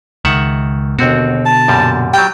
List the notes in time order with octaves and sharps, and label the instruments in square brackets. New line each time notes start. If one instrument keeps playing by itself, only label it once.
[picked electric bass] C#2 [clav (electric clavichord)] D#3 E5 F#5
[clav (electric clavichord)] D#2 C4 F#4 [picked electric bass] B2 D3
[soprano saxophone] A5
[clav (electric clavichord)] F#2 A#2 G3
[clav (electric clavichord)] F#3 G3 [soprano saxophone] G5